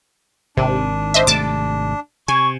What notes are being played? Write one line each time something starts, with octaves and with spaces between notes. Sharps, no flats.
G#1 C3 D#3 D4
C5 D#5 E5
G#1 C3 A3 A5 D6
C3 G#5 C#6